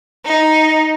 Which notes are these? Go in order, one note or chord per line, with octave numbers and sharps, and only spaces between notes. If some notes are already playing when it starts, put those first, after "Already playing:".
D#4